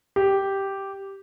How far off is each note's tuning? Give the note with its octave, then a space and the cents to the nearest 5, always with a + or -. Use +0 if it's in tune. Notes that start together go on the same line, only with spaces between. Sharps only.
G4 -5